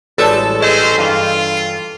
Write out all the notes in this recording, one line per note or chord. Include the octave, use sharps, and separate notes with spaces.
A1 G3 G#3 F#4 A4 C#5 D5
C4 C#4 G#4 C5 D#5
G2 E3 F4
C7